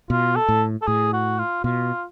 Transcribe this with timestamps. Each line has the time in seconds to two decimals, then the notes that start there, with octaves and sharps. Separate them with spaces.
0.10 B2 F4
0.36 A4
0.49 A2
0.82 A4
0.87 A2 G#4
1.13 F#4
1.39 F4
1.64 B2 F4